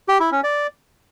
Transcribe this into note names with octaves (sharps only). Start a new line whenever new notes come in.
G4
E4
C#4
D5